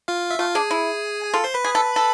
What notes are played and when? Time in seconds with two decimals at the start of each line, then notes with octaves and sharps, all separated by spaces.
0.08 F4 F5
0.31 E5
0.39 A3 F4 F5
0.55 D4 G#4 G#5
0.71 E4
1.24 G#5
1.33 F4 A4 A5
1.44 C5 C6
1.54 B4 B5
1.64 G#4
1.75 A4
1.96 A4